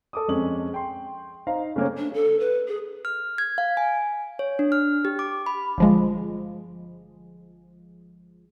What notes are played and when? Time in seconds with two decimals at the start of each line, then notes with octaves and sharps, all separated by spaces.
0.13 A4 D6 D#6
0.28 F2 G#3 C#4 F#7
0.74 G5 C6
1.47 D#4 C5 F5 A#5
1.76 C#3 A3 A#3 C4 C#5
1.97 D4
2.14 A4
2.40 B4
2.68 G#4
3.05 F6
3.38 G#6
3.58 F5
3.77 G#5
4.39 C#5
4.59 D4
4.72 F6
5.05 G4
5.19 D6
5.46 B5
5.78 G1 F3 G#3